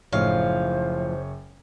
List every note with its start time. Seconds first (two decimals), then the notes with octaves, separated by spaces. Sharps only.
0.12 F#1 A2 F3 D#4 C5 C#5 F5